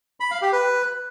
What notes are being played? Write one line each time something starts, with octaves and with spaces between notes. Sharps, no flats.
B5
F5
G4
B4